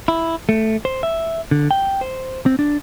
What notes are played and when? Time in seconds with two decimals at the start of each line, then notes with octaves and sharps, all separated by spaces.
0.08 E4
0.49 A3
0.85 C5
1.03 E5
1.51 D3
1.71 G5
2.01 C5
2.46 C4
2.59 D4